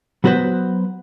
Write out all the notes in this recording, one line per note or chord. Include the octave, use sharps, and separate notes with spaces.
F#3 B3 F#4 B4 C5